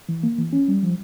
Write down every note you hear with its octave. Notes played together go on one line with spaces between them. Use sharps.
E3
A#3
E3
C#4
G3
F3